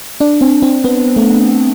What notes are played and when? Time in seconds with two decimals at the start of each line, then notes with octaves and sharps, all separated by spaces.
0.20 D4
0.41 C4
0.62 C4
0.84 B3
1.16 A3